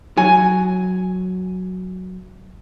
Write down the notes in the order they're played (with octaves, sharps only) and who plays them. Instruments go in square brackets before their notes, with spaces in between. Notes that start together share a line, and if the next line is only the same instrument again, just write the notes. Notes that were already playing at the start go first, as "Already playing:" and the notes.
[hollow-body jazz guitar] F#3 [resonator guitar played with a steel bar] G#5